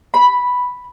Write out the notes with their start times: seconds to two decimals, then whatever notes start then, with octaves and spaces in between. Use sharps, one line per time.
0.14 B5